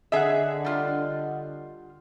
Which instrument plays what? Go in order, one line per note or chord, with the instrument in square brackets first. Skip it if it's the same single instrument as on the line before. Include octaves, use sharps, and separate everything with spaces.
[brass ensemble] D3 [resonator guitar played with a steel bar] G#4 E5 [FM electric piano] D#5 F#5
[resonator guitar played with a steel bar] G3 F4